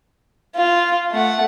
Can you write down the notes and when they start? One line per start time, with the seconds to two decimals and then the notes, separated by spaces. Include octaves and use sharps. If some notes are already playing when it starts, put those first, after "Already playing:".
0.56 F4
1.11 A3 F#5